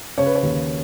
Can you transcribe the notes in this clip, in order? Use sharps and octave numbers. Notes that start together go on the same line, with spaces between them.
C#3 C#5
B4
C#5
D#2